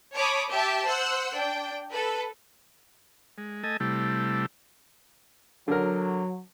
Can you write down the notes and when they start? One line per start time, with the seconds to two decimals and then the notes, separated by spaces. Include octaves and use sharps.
0.15 C#5 A5 B5 D6 D#6
0.51 G4 E5 A5
0.86 C5 F#5 E6 F#6
1.35 D4 G5
1.91 A4 B4
3.38 G#3
3.64 A3 A4 D#5 G#5
3.80 C3 G3 A3 E4
5.68 D3 F#3 A#4